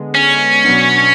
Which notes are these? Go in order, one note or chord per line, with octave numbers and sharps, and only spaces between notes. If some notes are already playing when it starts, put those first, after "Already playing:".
Already playing: D3 G#3 B3
C#4
B2 F#3 B3 D4